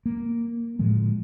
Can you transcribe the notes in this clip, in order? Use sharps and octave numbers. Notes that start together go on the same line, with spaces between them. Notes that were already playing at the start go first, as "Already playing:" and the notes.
A#3
A2 D3 F3 G#3